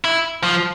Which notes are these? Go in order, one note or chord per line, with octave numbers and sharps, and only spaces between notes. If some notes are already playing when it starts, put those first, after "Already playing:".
E4
F3